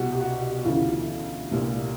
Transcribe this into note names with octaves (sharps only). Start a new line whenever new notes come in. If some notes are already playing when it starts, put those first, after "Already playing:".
Already playing: C2 B2 F#4 G4
G4
F#4
D2 C#3 E3 F4
C2 A#2